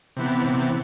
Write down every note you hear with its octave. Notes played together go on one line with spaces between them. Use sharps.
C3 E3 B3
C3 E3 B3